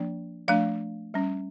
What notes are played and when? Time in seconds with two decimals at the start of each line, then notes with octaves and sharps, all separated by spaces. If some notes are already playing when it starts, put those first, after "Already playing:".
Already playing: F3 A#3 D4
0.48 F3 A3 D4 F5
1.14 G3 C#4